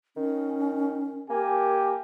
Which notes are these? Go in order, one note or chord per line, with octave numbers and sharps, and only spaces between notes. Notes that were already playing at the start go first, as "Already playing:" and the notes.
D#3 C#4
A#3 G4 A#4 G#5